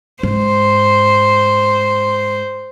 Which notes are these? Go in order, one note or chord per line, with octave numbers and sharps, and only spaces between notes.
G#2 C5